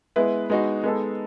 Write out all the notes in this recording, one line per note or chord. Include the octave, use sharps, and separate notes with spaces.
G#3 B3 E4 B4
G#3 B3 D#4 F#4
G#3 B3 D#4 A4